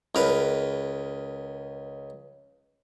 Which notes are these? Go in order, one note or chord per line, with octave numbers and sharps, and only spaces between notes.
C#2 A#4 B4